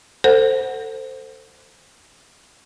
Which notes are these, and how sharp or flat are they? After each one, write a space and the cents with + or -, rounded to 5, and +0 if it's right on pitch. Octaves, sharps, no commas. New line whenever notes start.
A4 +30 C5 +0 F#5 +0